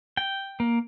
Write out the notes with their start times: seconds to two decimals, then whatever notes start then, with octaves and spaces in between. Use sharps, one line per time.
0.17 G5
0.60 A#3